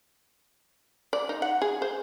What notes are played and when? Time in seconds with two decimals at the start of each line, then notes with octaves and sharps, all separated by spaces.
1.13 D5
1.29 D#4
1.42 F#5
1.62 G#4
1.82 C5